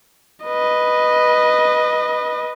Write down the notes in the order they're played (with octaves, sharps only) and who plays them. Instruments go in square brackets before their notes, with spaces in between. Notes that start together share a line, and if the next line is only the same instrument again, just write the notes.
[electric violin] B4 D#5